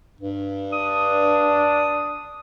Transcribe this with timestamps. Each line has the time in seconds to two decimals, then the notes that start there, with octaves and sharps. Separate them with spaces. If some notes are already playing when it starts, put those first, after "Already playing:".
0.21 G2
0.73 D4 D#6